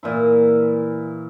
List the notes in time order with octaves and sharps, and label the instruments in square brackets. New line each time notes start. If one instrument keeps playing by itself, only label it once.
[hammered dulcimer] A#2 E3 E4